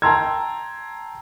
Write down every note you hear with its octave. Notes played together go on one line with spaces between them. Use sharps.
G5 A5 A#5 C6 E6 G#6